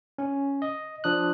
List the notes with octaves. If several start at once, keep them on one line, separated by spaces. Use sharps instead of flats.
C#4
D#5
F3 D4 D#6 F#6